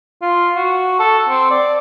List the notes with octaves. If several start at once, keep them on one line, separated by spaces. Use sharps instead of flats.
F4
F#4
A4
C4
D5